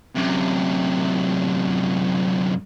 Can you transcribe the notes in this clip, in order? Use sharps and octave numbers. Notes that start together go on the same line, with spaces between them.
F#2 C3